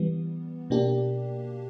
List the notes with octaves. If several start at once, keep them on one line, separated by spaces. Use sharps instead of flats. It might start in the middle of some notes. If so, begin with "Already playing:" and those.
Already playing: E3 G3 B3
B2 A#3 D4 G4